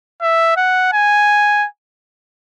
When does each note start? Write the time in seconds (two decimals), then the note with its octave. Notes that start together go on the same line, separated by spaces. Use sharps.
0.22 E5
0.57 F#5
0.93 G#5